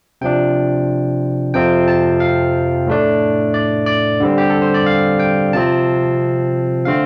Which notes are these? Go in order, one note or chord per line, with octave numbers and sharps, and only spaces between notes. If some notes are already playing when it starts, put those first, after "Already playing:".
C3 F3 D4 G5
F2 C3 F3 C4 G5
A5
F5
A2 A3 D4
D5
D5
D3 G3 C4
G4
A4
C5
D5
F5
G5
C3 F3 C4 A5
D3 A3 C4 F5